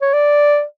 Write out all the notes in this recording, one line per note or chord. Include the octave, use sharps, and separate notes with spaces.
C#5
D5